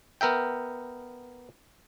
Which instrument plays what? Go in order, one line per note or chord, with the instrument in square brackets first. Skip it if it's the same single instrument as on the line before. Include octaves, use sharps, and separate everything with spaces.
[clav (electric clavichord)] B3 A#4 E5 G5